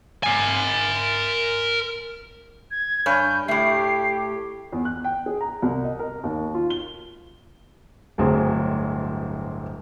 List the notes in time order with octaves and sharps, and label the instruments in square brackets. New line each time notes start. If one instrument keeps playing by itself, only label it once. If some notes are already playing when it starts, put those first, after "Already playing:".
[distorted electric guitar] A#4 G#5
[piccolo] G#6
[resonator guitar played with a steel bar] G2 C#5 G#5 [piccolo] G6
[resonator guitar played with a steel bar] A2 A3 [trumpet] G4 [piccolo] C7
[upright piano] E2
F#6
G5
G#4
A#5
C2
D#5
A#4
D#2
F4
G7
[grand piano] D1 G1 A2 F#3 C4 G#4